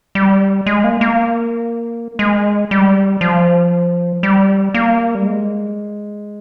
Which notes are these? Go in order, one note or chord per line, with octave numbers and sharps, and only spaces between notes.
G3
G#3
A#3
A#3
G#3
G3
F3
G3
A#3
G3
G#3